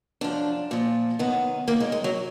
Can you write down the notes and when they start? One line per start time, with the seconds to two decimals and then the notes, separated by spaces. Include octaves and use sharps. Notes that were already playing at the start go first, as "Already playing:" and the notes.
0.21 F#2 F3 D4
0.71 A#2 F3
1.19 F#2 D#3 B3
1.68 F#2 D#3 A#3
1.80 G#3
1.92 G#3
2.04 F#3